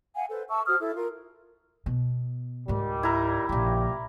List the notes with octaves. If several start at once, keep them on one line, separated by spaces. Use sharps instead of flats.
F5 F#5 G#5
A4 B4 C5
E5 A5 C#6 E6
F#4 C5 D#6 F6
E4 A4
F4 A#4
B2
C#2 G#2 D#3 G3
E4 A#4
A#1 C#3 G3 F4 G4